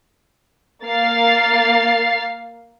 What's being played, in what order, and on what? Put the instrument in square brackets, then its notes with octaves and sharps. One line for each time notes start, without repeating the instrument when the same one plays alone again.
[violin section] A#3 F5 A6 C7